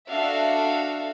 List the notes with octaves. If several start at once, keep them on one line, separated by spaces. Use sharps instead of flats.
D4 F#4 A4 E5 F5